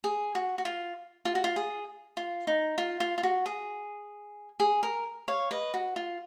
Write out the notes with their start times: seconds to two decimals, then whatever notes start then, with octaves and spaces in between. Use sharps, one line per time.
0.04 G#4
0.35 F#4
0.58 F#4
0.65 F4
1.25 F4
1.35 F#4
1.44 F4
1.56 G#4
2.17 F4
2.47 D#4
2.78 F4
3.00 F4
3.18 F4
3.23 F#4
3.46 G#4
4.60 G#4
4.83 A#4
5.28 C#5 F5
5.51 B4 D#5
5.74 F#4
5.96 F4